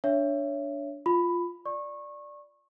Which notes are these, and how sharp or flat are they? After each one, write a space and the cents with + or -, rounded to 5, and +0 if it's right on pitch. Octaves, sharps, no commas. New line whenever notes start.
D4 -15 C#5 +10 E5 +25
F4 +0 B5 +10
D5 +0 C#6 -25